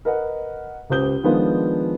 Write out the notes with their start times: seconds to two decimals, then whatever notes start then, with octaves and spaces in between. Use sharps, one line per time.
0.05 A#4 B4 D#5 F#5
0.90 C#2 G4 C5 D#6 G6 G7
1.24 D#3 F3 G#3 B3 D4 F4